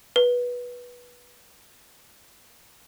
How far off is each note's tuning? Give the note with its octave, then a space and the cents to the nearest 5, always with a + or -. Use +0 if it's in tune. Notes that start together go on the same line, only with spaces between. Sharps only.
B4 -15